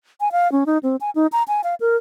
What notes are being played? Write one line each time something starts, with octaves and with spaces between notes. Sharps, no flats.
G#5
F5
C#4
D#4
C4
G#5
D#4
A#5
G#5
F5
A#4